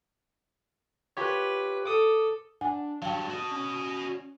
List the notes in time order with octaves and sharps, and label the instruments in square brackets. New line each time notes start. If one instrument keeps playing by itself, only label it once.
[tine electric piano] F4 G4 C#5 [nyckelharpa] B4
[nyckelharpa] A4 [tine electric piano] D6 D#6
[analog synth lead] D4 [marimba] F#5 G#5
[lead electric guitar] G2 F#3 [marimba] F5 G5 [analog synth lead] A5
[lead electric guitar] F#4 D#5
[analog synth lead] C#4